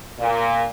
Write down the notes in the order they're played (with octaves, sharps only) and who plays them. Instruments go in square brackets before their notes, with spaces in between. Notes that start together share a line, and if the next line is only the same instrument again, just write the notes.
[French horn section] A#2